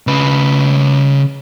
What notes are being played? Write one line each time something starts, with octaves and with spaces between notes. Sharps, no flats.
C#3 B4